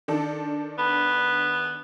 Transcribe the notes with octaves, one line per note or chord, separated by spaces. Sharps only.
D#3 D4 A4
B3 B5